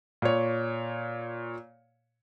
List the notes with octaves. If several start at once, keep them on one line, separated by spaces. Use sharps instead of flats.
A#2 C#5